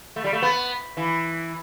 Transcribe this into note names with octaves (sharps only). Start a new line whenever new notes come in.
A3
G3
A3
B3
E3